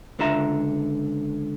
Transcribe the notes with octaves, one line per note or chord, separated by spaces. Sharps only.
C#2 D3 F4 E5 A#5